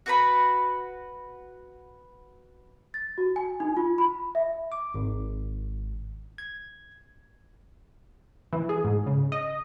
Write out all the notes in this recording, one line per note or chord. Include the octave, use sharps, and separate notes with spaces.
F#4 B4 B5
A6
F#4
G#5
D#4
F4
B5
E5
D6
G#1
G#6
E3
G#4
G#2
C#3
D#5